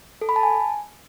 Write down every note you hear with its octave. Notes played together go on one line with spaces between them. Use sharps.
A4
B5
A5
G#5